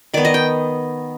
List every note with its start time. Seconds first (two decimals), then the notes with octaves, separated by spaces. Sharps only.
0.14 D#3 B3 D5
0.25 D#5
0.34 G5